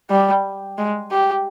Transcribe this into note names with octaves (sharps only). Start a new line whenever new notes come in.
G3
G#3
G4